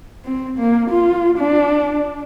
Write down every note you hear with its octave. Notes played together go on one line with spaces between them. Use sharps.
C4
A#3
F4
D4